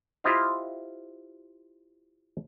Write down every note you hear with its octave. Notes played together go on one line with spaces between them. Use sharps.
E4 F4 G4 C5 D#5 F5